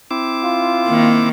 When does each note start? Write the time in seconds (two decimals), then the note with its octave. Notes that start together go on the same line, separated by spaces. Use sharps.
0.11 C4 E4 D6
0.44 F4
0.87 D#3 A#3